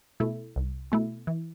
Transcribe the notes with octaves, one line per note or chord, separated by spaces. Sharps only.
B2 A3 E4
C2
B2 A3 E4
E3